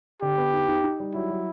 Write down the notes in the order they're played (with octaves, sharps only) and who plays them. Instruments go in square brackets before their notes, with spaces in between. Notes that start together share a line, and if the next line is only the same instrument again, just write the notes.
[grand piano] D3 [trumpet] G4
[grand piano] B3
D#4
D#4
D#4
G3
[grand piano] F#3 [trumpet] E4
[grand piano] F#3